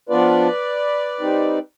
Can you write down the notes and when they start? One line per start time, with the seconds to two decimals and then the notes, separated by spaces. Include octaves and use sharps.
0.09 F3 B3 D4 F4 B4 D5
1.20 G3 C4 D#4